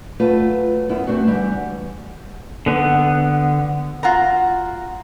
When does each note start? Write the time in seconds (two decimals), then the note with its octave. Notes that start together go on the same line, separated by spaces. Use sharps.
0.19 F#3 A3 F4 B4
0.89 F#2 B3 E4
1.07 A3 C4 D4 F#4
1.27 D3 E3 G3
2.66 D3 B3
4.03 F4 F#4 F#5 A#5